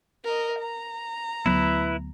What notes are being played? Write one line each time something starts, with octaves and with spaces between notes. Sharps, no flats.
A#4 D#5
A#5
D2 F#3 B3 E4 B4